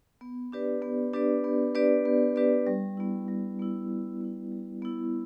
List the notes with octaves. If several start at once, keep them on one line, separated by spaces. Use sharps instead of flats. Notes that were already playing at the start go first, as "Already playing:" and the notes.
B3
D4 G4 B4 D5
B3
D4 G4 B4 D5
B3
D4 G4 B4 D5
B3
D4 G4 B4 D5
G3
B3 E4
G3
B3 E4
G3
B3 E4
G3
B3 E4